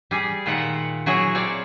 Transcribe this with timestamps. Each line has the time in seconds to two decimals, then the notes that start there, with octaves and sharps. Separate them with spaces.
0.11 G3 G#4
0.46 A#2 D#3 F4 A#4 E5 F#5
1.06 F#3 E4 F#4 G#4 C#5
1.35 C4 C#5 D5 F5